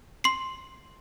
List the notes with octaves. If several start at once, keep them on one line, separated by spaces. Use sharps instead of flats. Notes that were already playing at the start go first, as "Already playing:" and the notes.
C6 C7